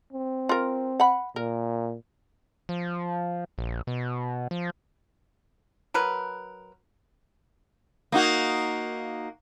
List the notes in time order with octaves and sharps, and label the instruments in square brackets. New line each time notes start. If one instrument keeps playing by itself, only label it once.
[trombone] C4
[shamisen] F4 A#4
F#5 B5
[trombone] A#2 [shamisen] A#4
[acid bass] F3
A#1
B2
F3
[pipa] F#3 A#4 B4
[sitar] A#3 D#4 F#4